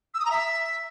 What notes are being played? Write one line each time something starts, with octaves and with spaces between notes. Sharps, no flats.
E6
D#6
A#5
E5